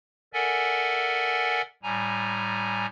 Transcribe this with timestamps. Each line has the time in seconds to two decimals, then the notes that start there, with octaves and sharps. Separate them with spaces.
0.33 A4 A#4 D5 E5 F#5 G#5
1.83 A2 G3 G#5 A#5